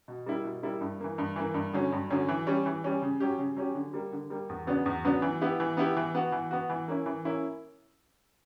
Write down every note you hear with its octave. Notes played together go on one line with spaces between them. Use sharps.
B2
G3 A#3 E4
B2
G3 A#3 E4
G2
E3 A#3
G2
E3 A#3
G2
D3 F#3 C#4
G2
D3 F#3 C#4
E3
G3 C#4
E3
G3 C#4
C#3
F#3 C#4 G4
C#3
F#3 C#4 G4
D3
G3 A#3
D3
G3 A#3
E2
C#3 F#3 B3 D4
E2
C#3 F#3 B3 D4
E3
B3 E4 G4
E3
B3 E4 G4
E3
B3 F#4
E3
B3 F#4
E3
A#3 C#4 E4
E3
A#3 C#4 E4